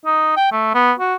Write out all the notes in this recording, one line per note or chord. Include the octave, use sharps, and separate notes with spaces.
D#4
G5
A3
B3
F#4